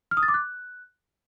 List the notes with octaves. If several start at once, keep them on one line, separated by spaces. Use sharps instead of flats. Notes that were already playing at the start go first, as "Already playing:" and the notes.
F6
D#6
A6
D6
F#6